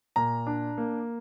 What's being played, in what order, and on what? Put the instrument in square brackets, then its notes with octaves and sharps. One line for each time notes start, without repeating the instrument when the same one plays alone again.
[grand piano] A#2 A#5
D4
A#3